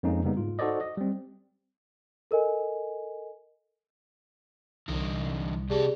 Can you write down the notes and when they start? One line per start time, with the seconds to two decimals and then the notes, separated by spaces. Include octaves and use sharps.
0.03 F2 G#3 A#3 C#4 D#4
0.24 C#3 G3 A#3 B3 D#4
0.37 G#2 F4
0.59 D#4 F#4 A4 C5 D5 D#5
0.81 D#5
0.98 G3 C4
2.31 A4 A#4 D#5 G#5
4.88 C2 D3 E3 D#4
5.70 C3 C4 G4 G#4 D5 A5